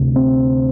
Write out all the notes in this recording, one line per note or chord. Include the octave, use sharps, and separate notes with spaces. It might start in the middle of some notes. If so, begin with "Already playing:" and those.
Already playing: D2 C3
C4